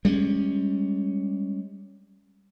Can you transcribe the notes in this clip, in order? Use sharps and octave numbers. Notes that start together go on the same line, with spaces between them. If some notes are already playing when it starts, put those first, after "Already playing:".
G3 G#3 A#3 C#4